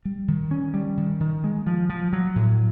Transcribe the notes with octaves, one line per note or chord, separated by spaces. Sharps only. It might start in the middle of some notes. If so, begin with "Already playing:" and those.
G3
D#3
C#4
G3
D#3
D#3
G#3
F3
F3
F#3
A2